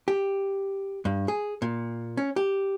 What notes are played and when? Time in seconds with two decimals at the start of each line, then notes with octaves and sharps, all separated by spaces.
0.08 G4
1.05 G2
1.28 G#4
1.62 A#2
2.17 C#4
2.36 G4